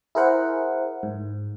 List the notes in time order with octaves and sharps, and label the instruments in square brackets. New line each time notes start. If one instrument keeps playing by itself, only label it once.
[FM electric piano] E4 G#4 A#4 C5 F#5
G#2